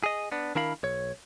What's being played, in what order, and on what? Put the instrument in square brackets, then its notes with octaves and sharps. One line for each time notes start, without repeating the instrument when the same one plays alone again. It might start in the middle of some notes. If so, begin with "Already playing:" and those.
[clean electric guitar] G#4 D#5
B3 D4
D#3 D4 E4 A#4 F5 B5
B1 C#5